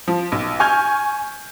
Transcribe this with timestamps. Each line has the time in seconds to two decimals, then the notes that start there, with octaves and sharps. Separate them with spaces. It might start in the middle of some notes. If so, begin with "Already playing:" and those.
0.08 F3
0.32 B1
0.60 G#5 C#6 F6 G6 G#6